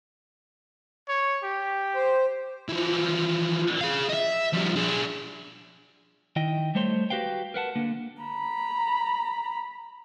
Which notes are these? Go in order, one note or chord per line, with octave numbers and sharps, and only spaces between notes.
C#5
G4
C5
E3 F3
G#4 F5
D#5 E5
F2 G3
D4 G#4
D#3 E4 D#5 G5
G3 A3 C5 C#5 C6
F#4 G4 B4 F5 G5
A#4 B4 F#5 A5
D3 A#3
A#5 B5